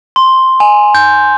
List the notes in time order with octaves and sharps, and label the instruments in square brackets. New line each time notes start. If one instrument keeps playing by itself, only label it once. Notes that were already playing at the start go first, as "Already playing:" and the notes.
[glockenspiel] C6
G#5
G6